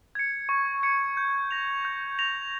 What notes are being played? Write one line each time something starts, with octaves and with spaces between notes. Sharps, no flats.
G#6 C#7
C#6
G#6 C#7
G6
A#6 F7
G6
A#6 F7